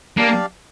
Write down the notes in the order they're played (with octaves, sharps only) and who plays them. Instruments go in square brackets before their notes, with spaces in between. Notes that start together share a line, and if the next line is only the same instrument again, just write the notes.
[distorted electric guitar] A#3 [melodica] D4 G4 D5 F5